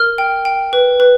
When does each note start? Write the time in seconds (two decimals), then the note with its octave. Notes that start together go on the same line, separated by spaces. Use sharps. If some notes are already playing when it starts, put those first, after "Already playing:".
Already playing: A#4 F6
0.18 G5
0.45 G5
0.73 B4
1.00 B4